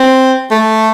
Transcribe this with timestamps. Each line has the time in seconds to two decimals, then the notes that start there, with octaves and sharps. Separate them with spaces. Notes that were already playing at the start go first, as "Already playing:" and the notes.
Already playing: C4
0.51 A3